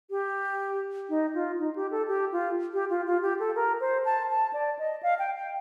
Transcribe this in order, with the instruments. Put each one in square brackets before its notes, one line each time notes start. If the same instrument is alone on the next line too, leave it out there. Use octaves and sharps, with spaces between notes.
[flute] G4
D#4
F4
D#4
G4
A4
G4
F4
G4
F4
F4
G4
A4
A#4
C5
A5
A5
D5
D#5
F5
G5
G5